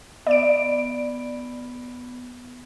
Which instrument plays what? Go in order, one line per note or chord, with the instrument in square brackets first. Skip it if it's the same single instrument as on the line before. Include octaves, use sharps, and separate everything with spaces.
[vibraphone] B3 [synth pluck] D5 D7